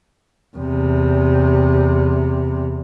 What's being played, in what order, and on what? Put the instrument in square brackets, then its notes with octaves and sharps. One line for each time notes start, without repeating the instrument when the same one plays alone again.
[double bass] E2 C3